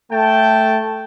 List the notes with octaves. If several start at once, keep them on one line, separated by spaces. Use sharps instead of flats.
A3 G5 A5